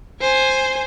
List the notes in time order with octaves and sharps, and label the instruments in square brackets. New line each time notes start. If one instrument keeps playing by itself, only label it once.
[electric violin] C5 G#5